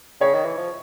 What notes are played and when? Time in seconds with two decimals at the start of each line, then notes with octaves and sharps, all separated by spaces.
0.21 C#3 C#5
0.34 D#3
0.45 E3
0.57 F3